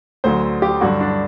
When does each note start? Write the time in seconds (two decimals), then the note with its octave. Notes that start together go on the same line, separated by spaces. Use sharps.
0.24 D2 D3 F#3 C5
0.62 G4
0.81 G2 D3 F#3 F#4
1.00 D4